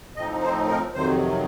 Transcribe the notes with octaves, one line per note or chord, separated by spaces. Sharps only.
A2 F3 C4 D#4 D#5
C5
A#4
F2 C3 D#3 F#3 C5